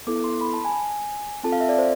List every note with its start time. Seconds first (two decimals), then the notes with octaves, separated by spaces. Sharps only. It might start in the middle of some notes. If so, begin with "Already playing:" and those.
0.07 B3 E4 A4 D6
0.24 C6
0.41 B5
0.54 A5
0.65 G#5
1.44 C4 F4 A4 A5
1.52 F5
1.60 E5
1.69 D5
1.79 C5